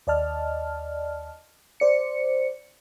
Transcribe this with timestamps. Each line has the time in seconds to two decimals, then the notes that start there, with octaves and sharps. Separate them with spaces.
0.07 D#2 D5 D#5 A5 F6
1.80 C5 D5 C#7